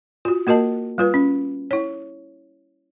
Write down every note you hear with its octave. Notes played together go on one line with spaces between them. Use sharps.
F4 F#4
A#3 F#4 A#4 D#5 A5
G3 F4 B4
C#4
E4 C#5